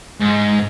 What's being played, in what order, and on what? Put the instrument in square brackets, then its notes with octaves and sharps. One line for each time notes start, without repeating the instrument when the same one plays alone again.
[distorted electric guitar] G#2